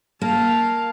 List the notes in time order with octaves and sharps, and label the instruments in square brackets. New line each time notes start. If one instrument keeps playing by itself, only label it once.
[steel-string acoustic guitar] A#3 [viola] F5 A5